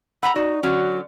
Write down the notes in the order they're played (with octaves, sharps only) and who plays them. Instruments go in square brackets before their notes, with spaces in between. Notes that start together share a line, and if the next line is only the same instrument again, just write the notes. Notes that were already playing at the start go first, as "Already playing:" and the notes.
[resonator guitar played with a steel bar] F#5 A#5 [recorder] B5 [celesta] E6 F#7
[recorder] D#4 [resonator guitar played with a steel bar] F#4 [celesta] D5
[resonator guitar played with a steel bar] D3 F#3 C#4 [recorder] F#4